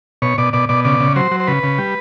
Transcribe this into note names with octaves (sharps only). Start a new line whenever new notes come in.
B2 C#5
B2 D5
B2 D5
B2 D5
C#3 D5
C#3
F#3 C5
F#3
C5
C#3 B4
C#3
G3